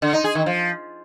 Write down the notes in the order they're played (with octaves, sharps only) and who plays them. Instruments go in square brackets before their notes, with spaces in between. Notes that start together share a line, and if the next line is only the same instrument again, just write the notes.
[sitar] D3
D#4
G#4
D#3
F3